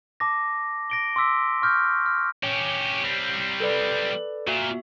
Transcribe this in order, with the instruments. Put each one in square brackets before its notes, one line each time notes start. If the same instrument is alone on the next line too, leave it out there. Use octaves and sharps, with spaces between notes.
[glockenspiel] A5 D6 A#6
A#6 D7 G7
C6 D6 E6 B6
C#6 F6 G6
F6
[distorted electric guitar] C#4 G4 [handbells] C#5
[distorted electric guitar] G3 C4
[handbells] A4 B4 D5
[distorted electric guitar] A#2 [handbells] F#4 E5